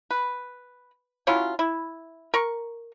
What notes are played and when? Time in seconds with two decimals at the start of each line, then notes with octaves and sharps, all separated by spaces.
0.11 B4
1.27 F#3 C#4 E4 F4
1.59 E4
2.34 A#4 C#6